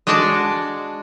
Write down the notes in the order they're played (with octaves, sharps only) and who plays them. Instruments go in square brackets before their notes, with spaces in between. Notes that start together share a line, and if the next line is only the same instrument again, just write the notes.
[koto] G#3 D4 F#4 D5 A5